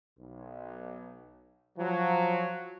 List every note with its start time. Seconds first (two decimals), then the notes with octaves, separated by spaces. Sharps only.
0.18 B1
1.78 F3 F#3